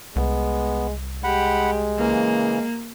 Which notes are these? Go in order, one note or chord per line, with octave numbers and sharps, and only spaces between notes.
C2 G#3 B3
G#3 G4 F#5 B5
C#3 E3 A#3